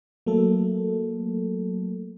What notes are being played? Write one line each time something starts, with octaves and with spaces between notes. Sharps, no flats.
F#3 A3 A#3 A4